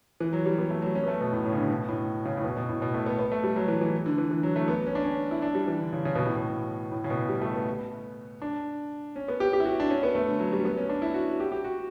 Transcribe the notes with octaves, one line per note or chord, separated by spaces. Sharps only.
E3
F#3
G3
B3
A3
F#3
C#4
B3
A3
B2
A2
A2
C#3
D3
B2
A2
C#3
A2
B2
B2
A2
B2
A3
B3
B3
A3
G3
F#3
E3
E3
D3
E3
E3
F#3
A3
B3
C#4
D4
C#4
E4
D4
G3
E3
D3
C#3
C#3
B2
A2
B2
A2
C#3
B2
G3
A3
B3
D4
C#4
B3
G4
G4
E4
F#4
D4
C#4
B3
A3
D3
F#3
G3
B3
C#4
D4
E4
F#4
G4
G4
F#4